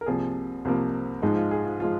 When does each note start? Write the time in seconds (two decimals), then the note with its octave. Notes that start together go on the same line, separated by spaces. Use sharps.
0.01 A#4
0.06 C2 C3 F3 A#3 G#4
0.65 C2 C3 F3 A#3
1.22 G#2 F3 G#3 D#4
1.36 F4
1.51 G#4
1.65 F4
1.80 F3 G#3 F4